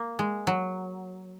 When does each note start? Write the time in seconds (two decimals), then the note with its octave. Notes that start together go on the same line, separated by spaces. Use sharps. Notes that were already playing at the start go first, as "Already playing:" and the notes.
Already playing: A#3
0.19 G#3
0.47 F#3